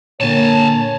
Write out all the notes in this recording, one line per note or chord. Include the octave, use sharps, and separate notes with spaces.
A#2 D3 A#3 C#5 G#5 A5